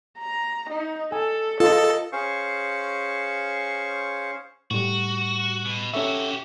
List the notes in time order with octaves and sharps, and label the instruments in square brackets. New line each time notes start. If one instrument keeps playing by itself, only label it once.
[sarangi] A#5
D#4
[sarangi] A4 [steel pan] G#5
[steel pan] F4 [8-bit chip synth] A4 [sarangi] D#5
[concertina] C#4 G#4 C5 F5 C#6
[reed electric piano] A2 G3 [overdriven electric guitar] F#4
[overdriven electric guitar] B2
[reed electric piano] C#4 A4 E5 [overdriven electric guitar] F#4 G4